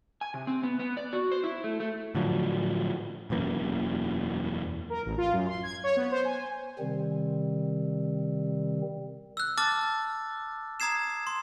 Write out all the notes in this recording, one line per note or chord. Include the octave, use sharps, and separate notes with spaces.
G#5
C3
C4
B3
B3
D5
F#4
C5
E4
A3
A3
A2 D3 F3 F#3
E1 F#2 E3 A#3
A#4
A1
F4
F#2
C6
G#6
C#5
B3
C5
G#5
C3 D#3 G3 C4
E6 F#6
A5 D6 F6 A6
A#5 D#6 G#6 C7 E7
C6